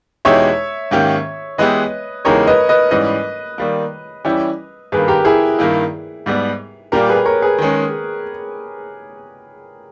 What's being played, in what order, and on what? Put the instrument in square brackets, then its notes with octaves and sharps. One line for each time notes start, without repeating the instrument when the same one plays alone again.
[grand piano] E2 B2 G#3 D#4 G4 [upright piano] C#5 E5
[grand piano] G#2 D#3 A#3 C#4 G4
[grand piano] E3 G#3 B3 E4 G4 [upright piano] B4 D#5
[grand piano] E2 C#3 G#3 D#4 G4 [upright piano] A#4 C#5
[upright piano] B4 D#5
B4 D#5
[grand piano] G#2 E3 G3 C#4 [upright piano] B4 D#5
[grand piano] D#3 G3 A#3
E3 G3 C#4 E4 G4
[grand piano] G2 D#3 A#3 [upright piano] G#4 B4
[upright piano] G4 A#4
E4 G#4
[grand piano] G2 D#3 A#3 E4
G#2 G3 B3
[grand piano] A#2 G3 A#3 [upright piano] G4 A#4
[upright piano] G#4 B4
A#4 C#5
G#4 B4
[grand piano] D#3 G#3 C#4